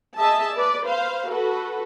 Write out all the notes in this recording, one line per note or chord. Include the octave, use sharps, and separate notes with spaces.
G#4 D#5 E5 A5
B4 D5
B4 C5 F5
F#4 A4 B4